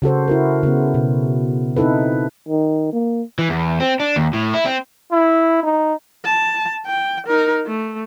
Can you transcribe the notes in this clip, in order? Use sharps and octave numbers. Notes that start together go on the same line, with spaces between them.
C#3 F#4 A4 C5
E4 F#4 A#4
C#3 B3
B2
C4 D#4 E4 A4 B4
D#3
A#3
E3
E2
C4
D4
D#2
A2
E4
C4
E4
D#4
A5
G5
D#4 A#4
A3